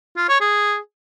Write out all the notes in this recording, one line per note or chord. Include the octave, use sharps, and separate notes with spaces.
F4
C#5
G#4